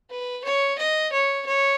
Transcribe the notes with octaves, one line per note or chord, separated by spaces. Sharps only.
B4
C#5
D#5
C#5
C#5